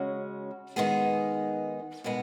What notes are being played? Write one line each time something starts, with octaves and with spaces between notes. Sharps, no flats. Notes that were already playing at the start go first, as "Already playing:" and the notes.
Already playing: C#3 G#3 C#4 F#4
D#3 G#3 B3 D#4 G#4
B2 G#3 B3